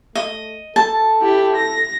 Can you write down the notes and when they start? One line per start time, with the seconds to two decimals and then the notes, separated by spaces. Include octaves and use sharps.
0.15 A3 D#5
0.76 A4 A5
1.21 E4 G4
1.56 A#6